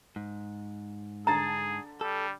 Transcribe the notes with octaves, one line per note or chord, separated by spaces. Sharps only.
G#2
D3 G#4 A5 A#5 A6
G3 A4